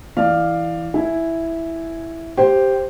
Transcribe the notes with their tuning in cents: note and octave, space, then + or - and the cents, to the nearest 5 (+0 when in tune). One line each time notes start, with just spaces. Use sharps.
E3 +0 D5 +20 F5 +0
E4 +0 G#5 +0
G4 +0 C5 +0